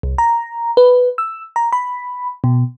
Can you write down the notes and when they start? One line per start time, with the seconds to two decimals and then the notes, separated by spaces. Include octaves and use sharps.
0.03 C2
0.18 A#5
0.77 B4
1.18 E6
1.56 A#5
1.73 B5
2.44 B2